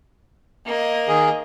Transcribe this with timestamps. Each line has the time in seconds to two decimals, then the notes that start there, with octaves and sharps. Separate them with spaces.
0.66 A#3 D#5
1.08 D#3 G#4